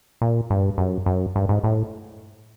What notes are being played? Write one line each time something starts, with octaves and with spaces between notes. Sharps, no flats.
A#2
G2
F#2
F#2
G2
G#2
A2